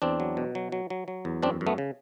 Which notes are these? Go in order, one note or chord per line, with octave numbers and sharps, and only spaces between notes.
E2 C4 D4
F#3
B2
F#3
F#3
F#3
F#3
E2
F#2 C4 D4
F#2
A3 B3
C#3